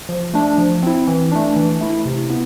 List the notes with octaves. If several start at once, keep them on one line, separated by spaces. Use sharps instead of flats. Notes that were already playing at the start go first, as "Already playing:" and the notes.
F3
A3 D4
F3
C4 E4
E3
A3 D4
E3
A3 E4
C3
B3 E4